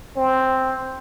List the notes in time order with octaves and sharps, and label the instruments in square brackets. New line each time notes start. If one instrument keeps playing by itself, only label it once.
[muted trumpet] C4